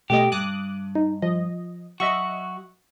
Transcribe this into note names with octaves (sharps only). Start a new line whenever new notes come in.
B2 A3 G4 D#5
G2 D6 D#6 F#6
D#4
F3 D#5
F#3 F#4 D#5 E5 C#6